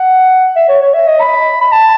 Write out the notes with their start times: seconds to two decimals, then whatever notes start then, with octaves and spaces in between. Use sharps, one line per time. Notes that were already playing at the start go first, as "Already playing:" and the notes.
Already playing: F#5
0.56 E5
0.68 C#5
0.82 C#5
0.94 E5
1.07 D#5
1.21 B5
1.61 B5
1.72 A5